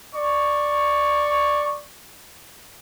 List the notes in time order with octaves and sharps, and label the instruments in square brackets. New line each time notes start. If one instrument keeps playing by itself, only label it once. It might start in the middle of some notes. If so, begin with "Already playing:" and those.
[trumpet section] D5 C#6